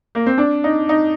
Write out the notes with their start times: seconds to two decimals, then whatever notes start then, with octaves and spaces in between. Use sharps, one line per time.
0.15 A#3
0.26 C4
0.38 D4
0.64 D#4
0.89 D#4